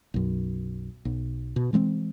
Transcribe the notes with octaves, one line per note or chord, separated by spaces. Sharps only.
B1 F#2
B1
B2
E3 G#3 A#3 C4